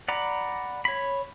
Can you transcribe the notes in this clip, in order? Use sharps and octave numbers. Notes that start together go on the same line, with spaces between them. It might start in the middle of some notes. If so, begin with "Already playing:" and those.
D5 F#5 A#5 B5 D6
C#5 B5